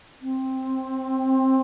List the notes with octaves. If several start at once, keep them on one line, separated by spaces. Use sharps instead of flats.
C4